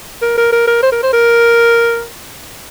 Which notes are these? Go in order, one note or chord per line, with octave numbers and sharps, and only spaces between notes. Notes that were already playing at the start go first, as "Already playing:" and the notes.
A#4
A#4
A#4
A#4
C5
A#4
C5
A#4